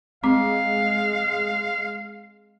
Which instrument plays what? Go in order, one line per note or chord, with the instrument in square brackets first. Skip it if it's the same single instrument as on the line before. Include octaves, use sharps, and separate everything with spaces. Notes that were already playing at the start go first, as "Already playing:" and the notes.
[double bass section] G#3 [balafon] C4 D6 [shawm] F5